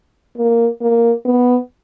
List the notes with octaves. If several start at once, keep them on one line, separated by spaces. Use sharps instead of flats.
A#3
A#3
B3